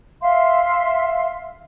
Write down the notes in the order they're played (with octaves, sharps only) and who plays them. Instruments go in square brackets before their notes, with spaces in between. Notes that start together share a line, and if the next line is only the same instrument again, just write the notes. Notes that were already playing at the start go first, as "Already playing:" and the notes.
[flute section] E5 F5 C6